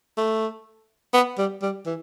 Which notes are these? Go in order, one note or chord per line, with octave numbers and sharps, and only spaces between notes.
A3
B3
G3
G3
E3